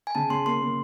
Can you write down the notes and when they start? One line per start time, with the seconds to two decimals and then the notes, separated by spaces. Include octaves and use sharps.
0.07 G#5
0.15 C#3 A5
0.30 C#3 C6
0.46 A#3 C6
0.62 A#3